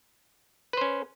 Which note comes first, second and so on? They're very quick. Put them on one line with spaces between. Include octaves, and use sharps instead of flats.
B4 C5 C#4